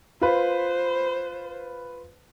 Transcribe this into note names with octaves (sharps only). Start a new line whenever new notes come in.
F4 B4 C5